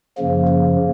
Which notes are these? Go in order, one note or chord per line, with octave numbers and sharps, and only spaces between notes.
F#2 C#3 F3 A#3
A#3